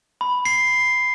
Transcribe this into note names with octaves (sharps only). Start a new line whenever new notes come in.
B5
C7